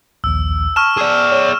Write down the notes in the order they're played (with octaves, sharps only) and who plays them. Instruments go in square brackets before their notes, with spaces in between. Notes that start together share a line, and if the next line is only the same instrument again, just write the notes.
[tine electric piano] A#1 D#2 [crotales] E6
[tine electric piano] A5 [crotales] C#6 F6 E7
[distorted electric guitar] G#4 D5
[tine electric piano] C#5